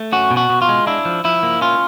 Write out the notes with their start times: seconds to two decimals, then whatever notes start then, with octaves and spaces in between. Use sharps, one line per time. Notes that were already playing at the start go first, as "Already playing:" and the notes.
Already playing: A3
0.12 C#4 F#4
0.31 B2
0.37 F#4
0.50 B2
0.62 F4
0.69 G#3
0.87 D4 E4
1.05 F3
1.24 F3 E4
1.43 A#3
1.61 C#4 F4